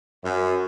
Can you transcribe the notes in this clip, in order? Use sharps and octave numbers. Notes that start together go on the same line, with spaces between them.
F#2